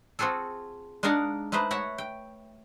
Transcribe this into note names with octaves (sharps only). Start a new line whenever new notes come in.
C4 F4 F#4 G#4 A4
G#3 D4 D#4 A#4 F5 F#5
G#3 A3 D#4 B4 C5
F#4 C#5 E5 F#5
G5